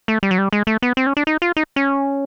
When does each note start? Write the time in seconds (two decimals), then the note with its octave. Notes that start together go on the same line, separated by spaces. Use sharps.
0.08 A3
0.23 G3
0.31 F#3
0.38 G3
0.53 G#3
0.67 A3
0.82 B3
0.97 C4
1.06 C#4
1.17 D4
1.27 D#4
1.42 F4
1.57 D#4
1.76 C#4